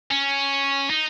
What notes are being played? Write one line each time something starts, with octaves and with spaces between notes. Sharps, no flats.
C#4
D#4